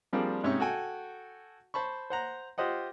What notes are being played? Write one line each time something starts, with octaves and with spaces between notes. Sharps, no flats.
F3 G3 A#3 C4 D4 G#4
G#2 C3 C#4 D#4 E5 C#6
F#4 A4 G5 G#5
C5 A5 B5 C#6
C5 F#5 A#5
F4 G4 C5 D#5 F#5